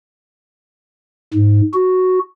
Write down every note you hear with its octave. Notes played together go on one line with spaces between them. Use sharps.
G#2
F#4